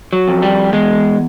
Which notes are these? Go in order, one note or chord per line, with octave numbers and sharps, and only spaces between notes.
F#3
F2
G3
E2 G#3